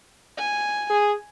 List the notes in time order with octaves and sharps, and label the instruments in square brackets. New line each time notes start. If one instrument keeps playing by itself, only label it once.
[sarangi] G#5
[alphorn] G#4